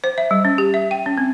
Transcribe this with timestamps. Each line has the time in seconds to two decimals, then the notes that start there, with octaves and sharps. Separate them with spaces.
0.04 C5
0.18 E5
0.31 G3
0.45 C#4
0.58 G4
0.74 E5
0.91 G5
1.06 C#4
1.18 C4